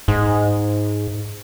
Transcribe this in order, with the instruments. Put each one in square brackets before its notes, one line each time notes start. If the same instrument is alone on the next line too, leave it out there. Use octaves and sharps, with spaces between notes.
[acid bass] G#2